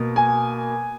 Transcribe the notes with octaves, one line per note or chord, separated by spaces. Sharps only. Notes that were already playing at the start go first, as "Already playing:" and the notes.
Already playing: B2 A#3
G#5